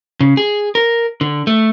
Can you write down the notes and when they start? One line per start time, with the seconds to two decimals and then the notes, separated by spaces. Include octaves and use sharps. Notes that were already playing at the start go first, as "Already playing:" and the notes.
0.21 C#3
0.37 G#4
0.75 A#4
1.21 D3
1.47 A3